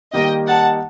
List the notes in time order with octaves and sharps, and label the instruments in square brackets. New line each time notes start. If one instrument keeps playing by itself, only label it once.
[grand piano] D#3 G3 A#3 D#4 G4 [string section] D#5 G5
[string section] F#5 A5